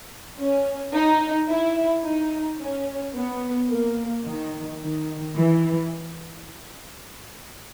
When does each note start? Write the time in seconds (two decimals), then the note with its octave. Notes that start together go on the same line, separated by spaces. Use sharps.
0.38 C#4
0.94 D#4
1.49 E4
2.04 D#4
2.60 C#4
3.15 B3
3.70 A#3
4.27 D#3
4.82 D#3
5.37 E3